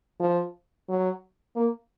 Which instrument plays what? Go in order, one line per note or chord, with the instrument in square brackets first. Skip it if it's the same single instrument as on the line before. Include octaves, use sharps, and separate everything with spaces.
[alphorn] F3
F#3
A#3